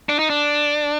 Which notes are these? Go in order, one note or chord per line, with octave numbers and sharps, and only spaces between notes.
D4
D#4
D4